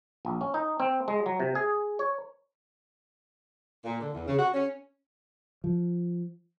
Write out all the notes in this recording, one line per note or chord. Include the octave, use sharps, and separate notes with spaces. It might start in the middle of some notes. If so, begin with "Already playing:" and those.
A#1
C#4
D#4
C4
G#3
F#3
C3
G#4
C#5
A#2
D3
E2
C#3
F#4
C#4
F3